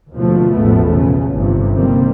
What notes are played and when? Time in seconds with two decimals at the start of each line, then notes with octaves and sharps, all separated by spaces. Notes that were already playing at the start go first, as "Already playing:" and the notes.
0.13 D#2 B2 D3 F3 A3
0.53 A1 E2 B2 F3 A3 B3
0.94 C#3
1.34 G1 G2 C3
1.74 C3 D#3 G3 A#3 C4